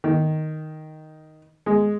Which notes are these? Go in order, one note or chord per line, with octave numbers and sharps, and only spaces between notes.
D#3
G#3